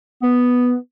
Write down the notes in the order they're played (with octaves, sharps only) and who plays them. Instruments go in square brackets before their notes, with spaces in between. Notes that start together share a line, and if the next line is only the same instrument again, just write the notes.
[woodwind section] B3